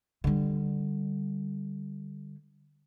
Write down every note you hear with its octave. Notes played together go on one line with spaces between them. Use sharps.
D3 G3